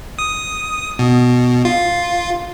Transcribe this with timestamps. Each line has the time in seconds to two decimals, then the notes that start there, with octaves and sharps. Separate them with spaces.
0.19 D#6
0.99 B2
1.65 F4